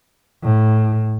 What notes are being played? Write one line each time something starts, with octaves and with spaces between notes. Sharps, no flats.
A2